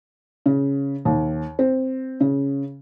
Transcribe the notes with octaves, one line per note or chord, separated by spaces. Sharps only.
C#3
D#2
C4
C#3